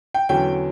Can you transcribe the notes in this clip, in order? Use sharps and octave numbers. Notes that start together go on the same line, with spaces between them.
G5
E2 D3 F#3 C#4 G5